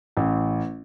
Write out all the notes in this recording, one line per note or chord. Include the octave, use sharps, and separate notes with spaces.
A1